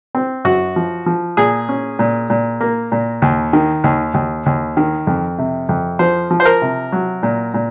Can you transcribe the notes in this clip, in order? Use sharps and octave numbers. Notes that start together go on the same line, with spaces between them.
C4
F#2 F#4
F3
F3
A#2 G#4
C#4
A#2
A#2
A#3
A#2
D#2
D#3
D#2
D#2
D#2
D#3
F2
C3
F2
F3 C5
F3
C5
A#4
C3
F#3
A#2
A#2